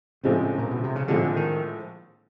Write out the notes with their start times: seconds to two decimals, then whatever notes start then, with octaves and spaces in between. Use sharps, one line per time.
0.23 A#1 A2 C#3 F3 G#3 C4
0.58 A#2
0.71 B2
0.84 C3
0.96 C#3
1.08 A#1 A2 D3 F3 G#3 C4
1.36 D#3